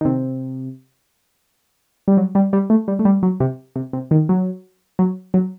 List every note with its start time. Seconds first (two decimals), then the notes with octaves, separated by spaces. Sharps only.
0.01 D#3
0.05 C3
2.08 G3
2.17 F#3
2.35 G3
2.53 G3
2.70 A3
2.88 G3
2.99 A3
3.05 G3
3.23 F#3
3.40 C3
3.76 C3
3.93 C3
4.11 D#3
4.29 F#3
4.99 F#3
5.34 F#3